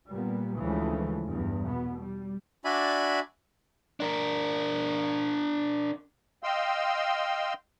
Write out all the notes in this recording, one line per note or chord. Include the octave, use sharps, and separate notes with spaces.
A#2 G3 A#3 B3
D2 C#3 E3 F3 G#3 A3
E2 G2
B2 B3
G3
D4 F#4 D5 E5 G#5 B5
D4 A#4
D#5 F5 G5 C6 E6